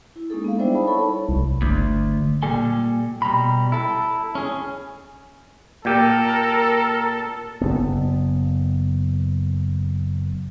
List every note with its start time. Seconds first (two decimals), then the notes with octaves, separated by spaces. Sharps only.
0.16 E4
0.30 G#3 A#3 C#4 D#4 G#4 A4
0.44 B3 G#4 F5
0.58 G3 D4 E4 C5 D5 E5
0.74 D#4 A5 B5
0.87 E4 A4 C#5 B5 C#6
1.29 C2
1.62 G1 D2
2.43 A#2 G3 A4 G#5
3.22 B2 G3 A#5 B5
3.72 E4 A4
4.35 C#4 G#4
5.85 A#2 G4 A4 A#4
7.61 F#1 B3